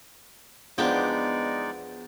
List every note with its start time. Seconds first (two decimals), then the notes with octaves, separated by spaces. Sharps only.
0.78 E2 F3 G#3 B3 D4 D#4 D5 G5